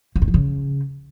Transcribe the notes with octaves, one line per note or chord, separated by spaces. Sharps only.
F3
G2
F3
C#3